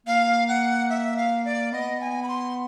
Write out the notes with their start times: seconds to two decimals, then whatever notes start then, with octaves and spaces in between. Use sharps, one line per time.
0.06 A#3 F5
0.48 F#5
0.90 E5
1.17 F5
1.45 D5
1.72 B3 D#5
2.00 G#5
2.23 B5
2.28 C6